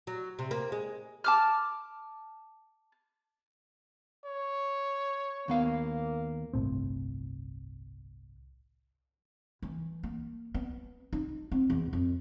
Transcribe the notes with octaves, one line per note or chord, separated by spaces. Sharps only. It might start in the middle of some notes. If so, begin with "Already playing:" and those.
F#3
C3
A#3
G#3
A5 D6 F6
C#5
D#2 A#3 B3 F5
G1 C2 A2 C4
E3
A#3
B3
D#4
C4
E2
F2